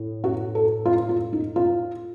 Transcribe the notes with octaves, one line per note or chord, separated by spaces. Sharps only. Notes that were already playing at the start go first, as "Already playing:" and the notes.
Already playing: A2
F#4
A4
F4
F4
D#4
F4